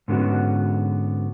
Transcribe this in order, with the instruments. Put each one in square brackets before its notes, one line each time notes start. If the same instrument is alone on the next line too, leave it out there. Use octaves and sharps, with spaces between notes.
[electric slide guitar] G#2 D3 B3 C#4 F#4